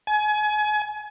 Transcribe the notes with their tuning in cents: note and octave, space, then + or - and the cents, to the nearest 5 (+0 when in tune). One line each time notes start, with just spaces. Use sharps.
G#5 +30